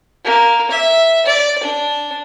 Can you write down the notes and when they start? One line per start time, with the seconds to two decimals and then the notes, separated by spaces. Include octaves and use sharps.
0.25 A#3
0.71 E5
1.26 D5
1.64 D4